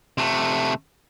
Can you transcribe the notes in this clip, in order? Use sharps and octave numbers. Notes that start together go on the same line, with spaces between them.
C3 A3